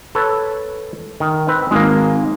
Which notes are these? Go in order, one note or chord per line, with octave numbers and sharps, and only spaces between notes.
A4 B4 C#5
D#3
C4 B4
G#1 G#3 A#3